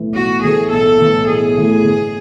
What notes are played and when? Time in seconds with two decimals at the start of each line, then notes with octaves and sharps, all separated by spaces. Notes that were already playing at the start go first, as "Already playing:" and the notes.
Already playing: B1 A2 E3 A3
0.15 B1 F#4
0.43 A2 E3 A3 G#4
0.71 B1 A4
0.99 A2 E3 A3
1.27 B1 G#4
1.55 A2 E3 A3
1.83 G1